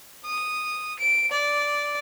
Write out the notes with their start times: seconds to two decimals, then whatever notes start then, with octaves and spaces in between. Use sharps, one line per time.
0.25 D#6
0.99 D7
1.32 D5